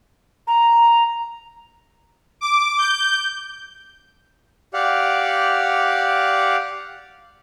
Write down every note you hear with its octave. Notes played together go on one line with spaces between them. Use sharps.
A#5
D6
G6
G4 D5 F5 F#5